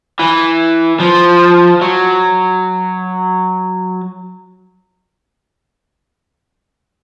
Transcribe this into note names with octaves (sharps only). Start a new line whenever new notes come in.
E3
F3
F#3